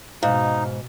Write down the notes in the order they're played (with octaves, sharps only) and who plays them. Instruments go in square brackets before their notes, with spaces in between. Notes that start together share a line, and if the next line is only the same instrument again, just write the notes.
[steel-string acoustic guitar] G#2 [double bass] B2 [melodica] D#4 [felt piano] F5